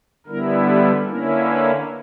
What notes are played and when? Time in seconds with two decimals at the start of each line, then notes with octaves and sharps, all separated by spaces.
0.27 D3 G3 B3 E4 A#4
0.67 G4
1.07 D3 A#3 C#4 E4 A#4
1.47 B4